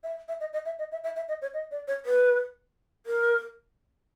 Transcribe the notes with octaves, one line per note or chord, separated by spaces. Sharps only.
E5
E5
D#5
D#5
E5
D#5
E5
E5
E5
D#5
C#5
D#5
D5
C#5
B4
A#4